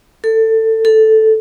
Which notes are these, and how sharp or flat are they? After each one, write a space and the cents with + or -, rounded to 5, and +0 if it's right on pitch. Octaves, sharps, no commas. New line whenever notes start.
A4 +20
A4 -5